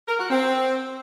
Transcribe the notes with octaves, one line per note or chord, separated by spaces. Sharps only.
A#4
F#4
C4